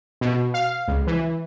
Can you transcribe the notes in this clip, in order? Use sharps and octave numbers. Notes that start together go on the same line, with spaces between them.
B2
F5
C#2
E3